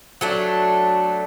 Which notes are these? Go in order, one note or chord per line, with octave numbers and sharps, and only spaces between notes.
F#3 A3 D4